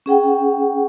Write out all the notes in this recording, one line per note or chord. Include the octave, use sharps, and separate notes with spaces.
C#4 G#4 F#5 G5